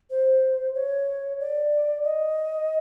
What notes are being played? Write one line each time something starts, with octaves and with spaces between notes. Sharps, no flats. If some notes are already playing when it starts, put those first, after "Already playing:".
C5
C#5
D5
D#5